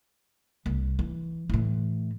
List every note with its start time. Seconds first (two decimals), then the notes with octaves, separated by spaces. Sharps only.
0.66 C2
0.99 E3
1.50 A2 E3